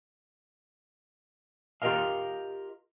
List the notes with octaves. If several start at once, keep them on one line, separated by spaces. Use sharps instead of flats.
F4 G4 G#4 A#4 D#5 F5